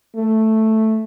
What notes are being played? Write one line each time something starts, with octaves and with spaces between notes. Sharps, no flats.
A3